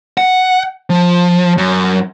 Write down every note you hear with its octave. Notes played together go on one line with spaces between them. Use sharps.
F#5
F3
F#2